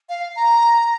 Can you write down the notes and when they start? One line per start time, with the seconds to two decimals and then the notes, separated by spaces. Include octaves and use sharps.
0.09 F5
0.36 A#5